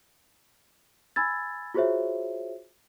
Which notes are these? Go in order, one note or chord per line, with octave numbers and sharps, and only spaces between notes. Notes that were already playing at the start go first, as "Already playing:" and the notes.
G#5 B5 E6 G#6 A6
F4 F#4 G#4 C5 C#5 E5